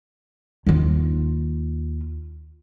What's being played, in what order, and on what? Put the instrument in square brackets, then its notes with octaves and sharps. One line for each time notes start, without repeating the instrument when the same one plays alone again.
[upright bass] D#2 F4